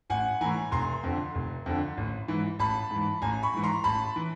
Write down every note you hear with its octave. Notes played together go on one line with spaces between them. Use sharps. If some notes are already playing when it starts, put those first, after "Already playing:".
A1 F#5 G#5
A2 E3 G#5 A#5
F1 A#5 C6
F2 D3
F1
F2 D3
A1
G#2 E3
A1 A5 B5
G#2 E3
A1 G#5 A#5
B5 C#6
G#2 E3
A#5 C6
A1 A5 B5
E3